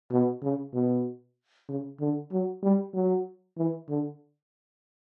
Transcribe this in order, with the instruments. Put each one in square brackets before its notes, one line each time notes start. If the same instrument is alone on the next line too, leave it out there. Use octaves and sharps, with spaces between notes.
[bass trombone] B2
C#3
B2
C#3
D3
F#3
G3
F#3
E3
D3